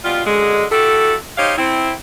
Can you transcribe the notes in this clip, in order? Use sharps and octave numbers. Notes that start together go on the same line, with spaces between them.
B2 G3 F4
F#2 D3 G#3
E4 F#4 G4 A4
D#4 G4 C5 C#5 F5
C4 E4